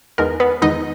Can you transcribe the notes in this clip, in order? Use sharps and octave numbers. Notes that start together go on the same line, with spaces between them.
E2 D#3 G#3 B3 A#4
B3 B4
E2 D#3 G#3 B3 D#4 D#5